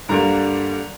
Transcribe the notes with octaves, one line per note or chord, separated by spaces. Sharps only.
G2 D3 G3 A#3 A#5